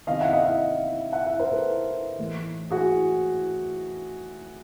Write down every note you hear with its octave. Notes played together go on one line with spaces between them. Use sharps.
C3 D#3 D#5 F5
E5 F#5
D#5 F5
D#5 F5
E5 F#5
E5 F#5
A#4 C5
A4 B4
A2 E3
F#4 G#4